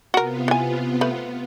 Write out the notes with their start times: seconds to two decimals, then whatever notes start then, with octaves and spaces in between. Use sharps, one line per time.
0.14 C3 B3 F4 F#4 A#4
0.48 E3 G#5
1.01 A3 B4